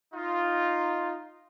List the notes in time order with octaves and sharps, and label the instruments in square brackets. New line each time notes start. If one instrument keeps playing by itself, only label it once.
[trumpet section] D#4 F4